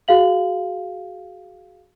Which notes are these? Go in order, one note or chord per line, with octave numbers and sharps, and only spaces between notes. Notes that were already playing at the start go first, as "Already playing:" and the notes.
F#4 G#4 F5 F#7